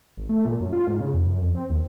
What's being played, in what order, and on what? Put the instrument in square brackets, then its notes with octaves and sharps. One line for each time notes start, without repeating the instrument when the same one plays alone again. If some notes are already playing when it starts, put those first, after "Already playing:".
[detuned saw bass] G#1
A3
A#2
F#2
F4
G#2
C#3
F2
F#2
F2
C4
D#2